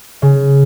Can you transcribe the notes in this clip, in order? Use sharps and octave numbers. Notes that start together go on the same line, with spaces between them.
C#3